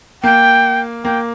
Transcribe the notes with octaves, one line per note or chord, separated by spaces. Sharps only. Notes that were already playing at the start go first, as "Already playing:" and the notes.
A#3 G5
A#3 G5